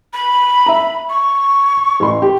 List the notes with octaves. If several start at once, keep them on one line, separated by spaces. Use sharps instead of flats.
B5
E5 A#5
C#6
A1 C6
G4